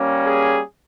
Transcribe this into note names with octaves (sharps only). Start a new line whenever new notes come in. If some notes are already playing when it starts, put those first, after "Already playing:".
Already playing: G3 A#3 C#4
G#4